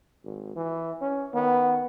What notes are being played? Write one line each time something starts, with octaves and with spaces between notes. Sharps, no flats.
G#1
E3
C#4
D#3 B3